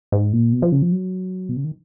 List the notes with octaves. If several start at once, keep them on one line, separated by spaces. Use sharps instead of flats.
G#2
A#2
B2
F3
C#3
F3
F#3
B2
C#3
D#3